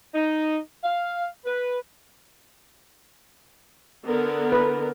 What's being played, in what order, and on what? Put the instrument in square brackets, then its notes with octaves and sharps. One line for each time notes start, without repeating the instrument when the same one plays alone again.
[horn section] D#4
F5
B4
[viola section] D3 B3 A#4
[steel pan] B4